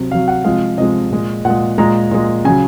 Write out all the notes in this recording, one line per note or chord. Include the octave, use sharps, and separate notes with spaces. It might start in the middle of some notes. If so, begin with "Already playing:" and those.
Already playing: C3 F#3
C3 F#3 F5
F#5
C3 F3 G#3 F5
C3 F3 G#3 D#5
A#2 G#3
A#2 G#3 F#5
A#2 G#3 A#5
A#2 G#3
C#3 F#3 G#5